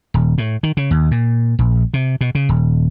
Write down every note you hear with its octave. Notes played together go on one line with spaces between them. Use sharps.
D#1
A2
D#3
C#3
D#2
A#2
A#1
C3
B2
C#3
D#1